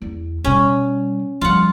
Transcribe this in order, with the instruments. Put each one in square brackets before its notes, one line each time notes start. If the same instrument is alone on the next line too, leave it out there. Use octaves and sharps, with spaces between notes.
[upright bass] E2
[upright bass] B2 G3 [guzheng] C#4
[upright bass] F3 G3 [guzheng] F4 F#5